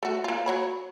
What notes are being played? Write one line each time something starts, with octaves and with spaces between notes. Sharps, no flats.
A3 F#4
A#3 F4
F#3 C#5 B5